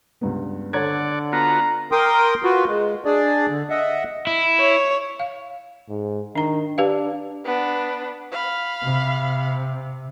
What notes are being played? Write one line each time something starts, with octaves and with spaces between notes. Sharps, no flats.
C#2 G2 B3
D3 C#5 D5 F#5 G#6
B3 F4 F#4 A#5
A#4 G5 C6 D6 D#6
F4 F#4 B4
G#3
D4 G#4 D5
D3
D#5 E5 F#5
E4
C#5
F5
G#2
D#3 D4 A#5
D4 G4 B4 F5
B3 D4
F5 B5
C3